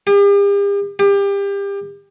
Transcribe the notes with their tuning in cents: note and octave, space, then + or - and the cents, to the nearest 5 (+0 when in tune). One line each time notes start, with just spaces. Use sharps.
G4 +45
G4 +30